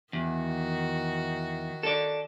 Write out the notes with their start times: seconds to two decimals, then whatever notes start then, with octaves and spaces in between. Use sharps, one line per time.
0.13 E2 D#3 F#4
1.83 A4 D5